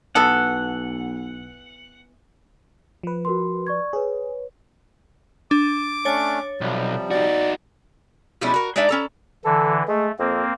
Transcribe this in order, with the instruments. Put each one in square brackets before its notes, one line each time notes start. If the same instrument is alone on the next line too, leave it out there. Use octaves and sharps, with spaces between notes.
[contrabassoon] B1 [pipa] E3 B3 A4 [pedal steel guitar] F#5
[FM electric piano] F3 B4
[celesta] F#4 A#4 C6
D5 C#6 G#6
[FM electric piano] G#4 [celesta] B4 C#5
[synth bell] D4 [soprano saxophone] D6
[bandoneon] A3 C#4 D4 [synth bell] C#5 A6
[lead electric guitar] B1 [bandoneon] C3 F3 G3
[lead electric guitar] D#4 F#4 [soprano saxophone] D5
[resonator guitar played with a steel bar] B2 F3 G3 G#3 C#4 E4
F#4 A#4
G#3 D4 D#4 D5 E5
C#4 A4 A#5
[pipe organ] D3 E3 [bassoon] A4
[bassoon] G#3 [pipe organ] A3
[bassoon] F2 [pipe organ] A#3 C4